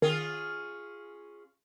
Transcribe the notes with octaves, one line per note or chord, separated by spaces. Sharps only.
D#3 C#4 F4 G#4